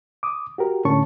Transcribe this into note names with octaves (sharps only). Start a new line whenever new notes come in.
D6 D#6
F#4 G4 A#4
A2 D3 C#4 A5 C#6